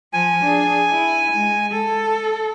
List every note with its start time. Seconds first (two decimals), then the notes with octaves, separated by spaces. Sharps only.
0.14 F3 G#5
0.44 D4 G#4
0.91 E4
1.33 G#3
1.72 A4